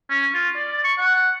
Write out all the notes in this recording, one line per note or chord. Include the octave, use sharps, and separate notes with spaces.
C#4
F4
D5
C#6
F#5